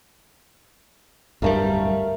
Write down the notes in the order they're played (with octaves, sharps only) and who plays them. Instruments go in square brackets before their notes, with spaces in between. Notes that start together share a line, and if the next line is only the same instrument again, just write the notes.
[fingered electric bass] D1 G2 G3 [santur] A3 A#4 F5